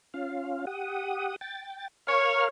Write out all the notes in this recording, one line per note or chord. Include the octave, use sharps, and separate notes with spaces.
C#4 F4 F5
G4 F#5 D#6
G5 A6
A#4 C#5 F5 F6